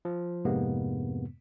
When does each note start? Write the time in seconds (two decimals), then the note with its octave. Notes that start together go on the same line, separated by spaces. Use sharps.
0.05 F3
0.45 F2 G#2 C3 G#3 A#3 B3